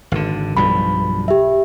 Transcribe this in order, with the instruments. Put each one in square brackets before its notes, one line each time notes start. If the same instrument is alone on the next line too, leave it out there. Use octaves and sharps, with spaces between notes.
[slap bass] G#1 D3
[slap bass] B1 G2 F3 [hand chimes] B5
[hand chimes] G4 E5